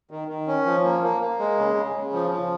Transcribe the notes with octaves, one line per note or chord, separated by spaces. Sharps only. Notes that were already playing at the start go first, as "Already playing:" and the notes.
D#3
D#3
C#4
F3
A#3
A#3
A#3
G#3
C#3
C#3
C#3
F3
F3